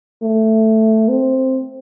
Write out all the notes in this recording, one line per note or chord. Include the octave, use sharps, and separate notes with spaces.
A3
C4